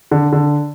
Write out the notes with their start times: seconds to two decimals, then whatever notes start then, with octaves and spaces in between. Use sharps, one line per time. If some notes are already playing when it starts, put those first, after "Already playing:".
0.11 D3
0.33 D3